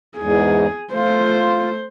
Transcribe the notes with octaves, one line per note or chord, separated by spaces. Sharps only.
E2 G#2 G#4
A3 F4 C5